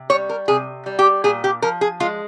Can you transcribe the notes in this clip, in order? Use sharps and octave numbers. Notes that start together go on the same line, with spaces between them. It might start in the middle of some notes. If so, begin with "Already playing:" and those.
Already playing: C3
G3 C#5
A#4
C3 G#4
G3
G4
A#2 G#4
G4
F3 A#4
G#4
G#3 F4